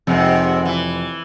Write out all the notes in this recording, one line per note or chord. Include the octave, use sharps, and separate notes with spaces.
F1 G#2 C3
E3